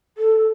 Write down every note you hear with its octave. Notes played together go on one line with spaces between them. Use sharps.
A4